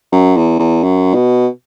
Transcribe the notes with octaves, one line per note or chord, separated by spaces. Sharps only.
F#2
E2
E2
F#2
B2